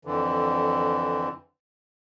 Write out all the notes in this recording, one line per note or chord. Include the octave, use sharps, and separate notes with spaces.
F2 D3 E3